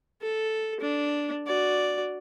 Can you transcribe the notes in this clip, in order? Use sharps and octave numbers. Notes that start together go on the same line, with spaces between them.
A4
D4
F#4 D5